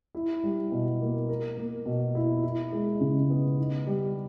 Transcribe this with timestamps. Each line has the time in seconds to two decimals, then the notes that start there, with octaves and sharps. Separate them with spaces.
0.15 E4
0.43 G3
0.72 B2
1.01 A#3
1.29 A#4
1.57 A#3
1.86 B2
2.15 E4
2.43 E4
2.73 G#3
3.01 C#3
3.30 B3
3.58 D#4
3.87 G3